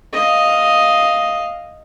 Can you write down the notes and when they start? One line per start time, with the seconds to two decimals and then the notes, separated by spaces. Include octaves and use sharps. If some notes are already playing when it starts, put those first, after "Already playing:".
0.12 D#5 F5